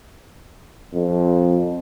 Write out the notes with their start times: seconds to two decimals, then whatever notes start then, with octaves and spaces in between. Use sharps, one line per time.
0.93 F2